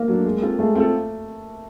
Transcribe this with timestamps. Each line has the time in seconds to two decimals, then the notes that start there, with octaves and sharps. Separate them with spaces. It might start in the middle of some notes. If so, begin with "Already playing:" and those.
Already playing: A#3
0.08 F#3 A3 D4
0.25 G#3
0.42 C4 F4 A4
0.59 G#3 A3
0.75 C4 F4 A4